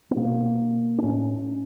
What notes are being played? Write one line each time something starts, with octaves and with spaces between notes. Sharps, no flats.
B3
B2 A#3
D4
A2 C#4